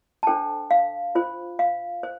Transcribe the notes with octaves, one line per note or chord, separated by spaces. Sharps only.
A5
D4 A4 C5 G5
F5
F4 C5
F5
C5